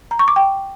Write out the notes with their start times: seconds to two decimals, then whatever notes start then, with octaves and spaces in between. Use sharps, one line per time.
0.11 A#5
0.19 C#6
0.28 D6
0.36 G5